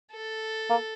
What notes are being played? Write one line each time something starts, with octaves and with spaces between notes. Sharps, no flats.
A4
A#3